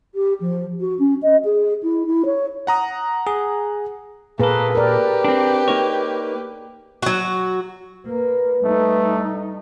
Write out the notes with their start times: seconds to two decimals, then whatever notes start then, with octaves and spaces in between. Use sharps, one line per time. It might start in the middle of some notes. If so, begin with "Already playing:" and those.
0.14 G4
0.40 F3
0.80 F#4
0.99 C#4
1.22 D#5
1.44 G#4
1.82 E4
2.06 E4
2.25 C#5
2.67 F#5 A#5 D#6
3.27 G#4
4.40 A#2 A#3 G#4 A4 B4
4.75 G4 A#4 B4 D5
5.25 C4 D4
5.68 A#3 D#4 C#5
7.02 F#3 F#4
8.06 A#3 B4
8.64 G3 A3 D#4